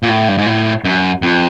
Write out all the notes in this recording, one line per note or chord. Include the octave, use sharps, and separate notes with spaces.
A#2
A2
G2
G#2
A2
F#2
F2